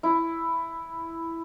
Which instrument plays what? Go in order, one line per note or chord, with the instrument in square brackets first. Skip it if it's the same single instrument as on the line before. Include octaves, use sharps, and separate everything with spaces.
[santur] E4